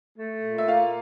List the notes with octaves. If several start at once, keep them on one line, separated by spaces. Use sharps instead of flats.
A3
A#2
E5
A#3 F4 F5